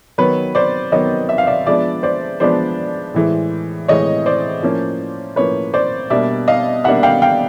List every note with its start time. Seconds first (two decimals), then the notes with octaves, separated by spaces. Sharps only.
0.18 D#3 F#3 B3 B4 C#5
0.55 C5 D5
0.92 D#3 F#3 B3 C#5 D#5
1.29 E5
1.38 F5
1.47 D5 E5
1.67 F3 G#3 B3 D4 D5 E5
2.03 C5 D5
2.40 F3 G#3 B3 D4 C5 D5
3.14 A2 E3 G#3
3.88 A2 E3 G#3 C#5 D#5
4.26 C5 D5
4.63 A2 F3 A#3 C#4
5.36 A2 F3 A#3 C#4 B4 C#5
5.74 C5 D5
6.10 B2 G3 A#3 D4 D5 E5
6.48 D#5 F5
6.84 B2 G3 A#3 D4 E5 F#5
7.03 F5 G5
7.22 F5 G5